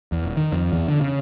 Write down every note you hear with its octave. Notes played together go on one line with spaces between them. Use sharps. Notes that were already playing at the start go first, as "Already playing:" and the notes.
E2
D#1
D#3
F2
E2
D3
C#3